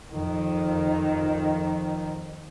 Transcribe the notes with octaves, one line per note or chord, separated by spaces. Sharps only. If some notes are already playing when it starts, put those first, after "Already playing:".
F2 D#3